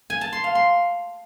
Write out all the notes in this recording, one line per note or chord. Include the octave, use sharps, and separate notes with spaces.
G#5
A5
C6
F5
C6